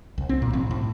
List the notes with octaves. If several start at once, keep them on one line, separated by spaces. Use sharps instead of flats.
C2
C4
A#2
A1
A2